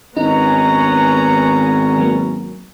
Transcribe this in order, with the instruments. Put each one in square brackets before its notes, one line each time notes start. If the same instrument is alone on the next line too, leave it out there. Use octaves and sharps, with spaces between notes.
[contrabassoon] G#1 [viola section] B3 C#4 A#5 [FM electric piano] D#4
[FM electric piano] F#3 A#3